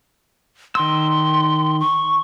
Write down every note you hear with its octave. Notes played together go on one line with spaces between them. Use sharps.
D#3 C6 E6
C#6